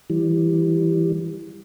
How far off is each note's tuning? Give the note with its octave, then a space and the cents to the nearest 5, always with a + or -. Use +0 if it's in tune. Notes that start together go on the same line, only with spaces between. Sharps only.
E3 +5 G3 +0